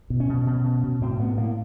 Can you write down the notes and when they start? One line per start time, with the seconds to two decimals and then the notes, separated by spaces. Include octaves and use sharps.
0.10 B2
0.20 C#4
0.29 B2
0.47 B2
0.64 B2
0.83 B2
1.01 A2 C4
1.19 A2 B3
1.37 A2 A#3